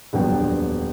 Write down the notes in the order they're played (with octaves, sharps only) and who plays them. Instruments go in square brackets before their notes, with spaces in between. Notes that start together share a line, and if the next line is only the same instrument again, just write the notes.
[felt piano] D#1 F2 F#3 B3 D4 G5